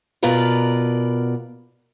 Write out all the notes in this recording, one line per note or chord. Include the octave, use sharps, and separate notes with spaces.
B2 F4 A#4 B4 D5